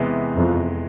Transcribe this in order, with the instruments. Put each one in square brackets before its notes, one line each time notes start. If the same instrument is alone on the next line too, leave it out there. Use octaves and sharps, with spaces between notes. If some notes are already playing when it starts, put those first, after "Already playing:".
Already playing: [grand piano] E2 C3 E3 G#3 B3
[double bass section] F2